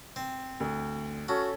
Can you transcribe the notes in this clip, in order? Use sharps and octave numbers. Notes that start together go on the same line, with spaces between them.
C4
D2
C#4 F#4 A4